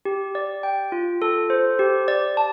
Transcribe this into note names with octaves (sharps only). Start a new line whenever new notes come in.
G4
D5
G5
F4
A4
C5
G4
D5
A5